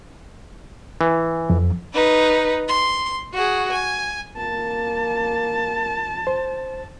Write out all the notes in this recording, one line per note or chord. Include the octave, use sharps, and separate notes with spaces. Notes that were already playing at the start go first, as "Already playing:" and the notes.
E3
F2
D#4 B4
C6
F#4 G#4
G#5
A#3 A5
C5